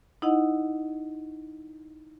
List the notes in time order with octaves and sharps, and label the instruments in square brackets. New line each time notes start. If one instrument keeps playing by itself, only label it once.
[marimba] D#4 E4 D#5 F#5